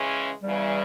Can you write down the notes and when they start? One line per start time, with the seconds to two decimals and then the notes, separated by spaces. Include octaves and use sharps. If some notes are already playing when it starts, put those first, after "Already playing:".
Already playing: C#3 E3 G#3 C#4
0.43 E2 C#3 E3 G3